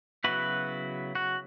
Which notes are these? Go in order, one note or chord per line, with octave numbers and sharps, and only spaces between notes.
C#3 F#3 B3 E4 F#4 B4
F#4